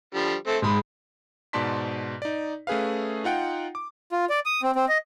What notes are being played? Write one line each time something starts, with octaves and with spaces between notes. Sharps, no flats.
D3 F3 G3
A3 C4
G#2 G#3 B5
G#2 B2 D5 A5 C6 B6
D#4 D5
A3 C#4 G#4 B4 F5
D#4 F4 F#5 G5
D6
F4
D5
D#6
C4
C4
D#5